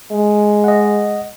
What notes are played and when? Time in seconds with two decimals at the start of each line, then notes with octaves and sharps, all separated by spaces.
0.11 G#3
0.64 D#5 F#5